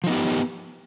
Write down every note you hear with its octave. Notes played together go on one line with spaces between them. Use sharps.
F3 B3 D#4 G4